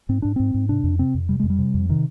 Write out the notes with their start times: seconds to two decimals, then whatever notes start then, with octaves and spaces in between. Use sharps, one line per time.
0.09 G#2 C4
0.22 G#2 D4
0.36 G#2 C4
0.54 G#2
0.69 C3 D4
0.84 F2
0.99 C3 C4
1.14 F2
1.29 C3 G3
1.40 F2 G#3
1.50 G3
1.59 C3
1.74 F2
1.89 C3 D#3